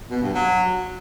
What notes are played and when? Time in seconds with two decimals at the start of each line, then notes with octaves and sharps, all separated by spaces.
0.10 B2
0.22 G2
0.34 F#3